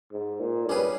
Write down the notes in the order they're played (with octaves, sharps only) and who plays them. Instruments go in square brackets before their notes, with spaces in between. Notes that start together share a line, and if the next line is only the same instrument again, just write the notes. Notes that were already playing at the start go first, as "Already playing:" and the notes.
[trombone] G#2
A#2
[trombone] G2 [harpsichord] G3 C#4 G#4 B4